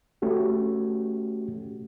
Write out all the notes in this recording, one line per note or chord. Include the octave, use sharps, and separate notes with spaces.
A3 C#4 F#4 G4